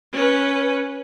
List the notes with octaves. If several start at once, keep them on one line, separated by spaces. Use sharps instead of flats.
C#4 B4